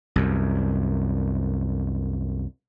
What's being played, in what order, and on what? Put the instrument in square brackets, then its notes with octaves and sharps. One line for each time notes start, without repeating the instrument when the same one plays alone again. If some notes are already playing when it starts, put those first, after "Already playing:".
[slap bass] C2 F#2